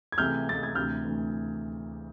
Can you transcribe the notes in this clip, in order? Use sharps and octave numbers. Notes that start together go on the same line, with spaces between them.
G#6
C#2 C3 E3 A3 F6 G6
C#2 C3 E3 A3 A6
G#6
D2 C3 E3 F6 G6
D2 C3 E3